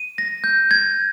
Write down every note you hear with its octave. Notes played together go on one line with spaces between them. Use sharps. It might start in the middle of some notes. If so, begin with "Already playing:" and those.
Already playing: D#7
A#6
G6
G#6